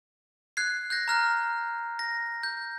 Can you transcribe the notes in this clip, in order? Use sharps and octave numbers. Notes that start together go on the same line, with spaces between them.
F#6 G#6 C7
F#6 G6 A#6
A#5 F6 F#6
A#6
G6